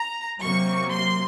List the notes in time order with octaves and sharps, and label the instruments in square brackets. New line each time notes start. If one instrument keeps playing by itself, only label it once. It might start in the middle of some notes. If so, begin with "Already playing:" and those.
Already playing: [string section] A#5
C3 F#3 A#3 C#6
C6